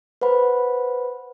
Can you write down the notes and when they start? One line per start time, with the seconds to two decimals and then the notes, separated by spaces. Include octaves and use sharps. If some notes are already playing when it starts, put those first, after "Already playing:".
0.21 B4 C5 F#5 B5